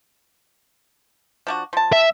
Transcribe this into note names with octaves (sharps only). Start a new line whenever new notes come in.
F3 D4 F#4
F3 A5
E5